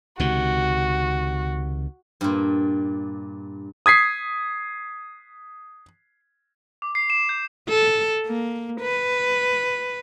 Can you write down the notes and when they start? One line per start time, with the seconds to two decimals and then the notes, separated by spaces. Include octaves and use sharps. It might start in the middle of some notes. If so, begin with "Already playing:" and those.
0.19 C#2 C3 D#3 F#4
2.21 G2 A#2
3.86 D#6 G#6 B6 C7
6.82 D6
6.95 C7
7.10 E7
7.29 G6
7.69 A4
8.27 A#3
8.81 B4